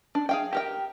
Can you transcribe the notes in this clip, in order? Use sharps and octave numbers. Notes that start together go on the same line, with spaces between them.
D4
G#4 F5 G5
G4 A#4 G5